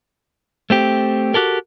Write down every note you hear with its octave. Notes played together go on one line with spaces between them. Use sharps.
A3 C4 G4
F#4 G4 A4 A#4